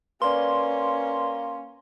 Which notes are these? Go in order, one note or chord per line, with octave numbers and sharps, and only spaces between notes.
A#3 C#4 B4 D5 C6